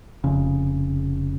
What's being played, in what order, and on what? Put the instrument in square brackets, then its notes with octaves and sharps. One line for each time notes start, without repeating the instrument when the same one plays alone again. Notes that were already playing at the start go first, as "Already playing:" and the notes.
[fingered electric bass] F1 C#3